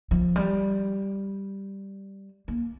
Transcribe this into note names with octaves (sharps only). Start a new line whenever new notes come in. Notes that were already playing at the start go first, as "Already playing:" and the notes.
F3
G3
A#3